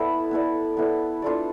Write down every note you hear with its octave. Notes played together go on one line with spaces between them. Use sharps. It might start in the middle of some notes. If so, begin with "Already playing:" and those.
Already playing: B3 E4 A4 D5
B3 E4 A4 D5
B3 E4 A4 D5
D4 F4 A4 D5